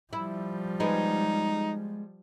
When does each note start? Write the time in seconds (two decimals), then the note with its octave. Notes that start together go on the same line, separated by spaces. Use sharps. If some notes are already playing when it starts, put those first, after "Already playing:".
0.13 F3 G3 E4
0.80 G#3 B3 D#4